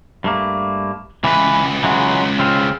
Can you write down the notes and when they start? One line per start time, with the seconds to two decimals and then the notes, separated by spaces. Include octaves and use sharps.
0.24 G2 A3 A#3
1.24 C#2 E3 B4
1.83 E3 F#3 G#3
2.39 C#3 C4 F4